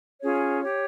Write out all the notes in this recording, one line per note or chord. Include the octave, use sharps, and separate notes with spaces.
C#4 F4 G#4 C#5
G4 C#5